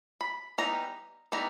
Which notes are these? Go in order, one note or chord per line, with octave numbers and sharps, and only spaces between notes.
B5
E3 G3 B3 D#4 A#5
E3 G3 B3 D#4 A#5